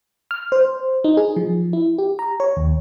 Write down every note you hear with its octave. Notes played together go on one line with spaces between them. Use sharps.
F6
C5
D#4
G#4
F3
E4
G4
A#5
C#5
D#2